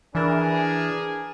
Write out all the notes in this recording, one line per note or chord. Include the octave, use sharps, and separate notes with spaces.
E3 D4 G#4 A#4